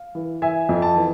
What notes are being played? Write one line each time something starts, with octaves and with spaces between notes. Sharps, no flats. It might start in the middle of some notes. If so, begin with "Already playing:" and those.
Already playing: F5
E3
E3 E5 G#5
F2
A5
E3